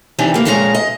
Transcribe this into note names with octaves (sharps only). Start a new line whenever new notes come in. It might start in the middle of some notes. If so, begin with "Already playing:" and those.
C3 E3 D4 D#4 G4
E3 A#3
F2 A#2 G#3 C#4 F4 A#5
D#5